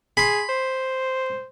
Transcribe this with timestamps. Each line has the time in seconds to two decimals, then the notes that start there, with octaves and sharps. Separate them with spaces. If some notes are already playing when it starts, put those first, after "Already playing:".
0.17 G#4 B5 C6
0.49 C5